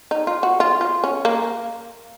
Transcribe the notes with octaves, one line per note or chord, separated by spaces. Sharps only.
D#4
F4
F#4
F4
F4
C#4
A#3